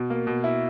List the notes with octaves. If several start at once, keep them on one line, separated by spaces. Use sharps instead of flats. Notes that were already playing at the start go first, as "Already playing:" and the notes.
Already playing: B2
A#3
B2
E4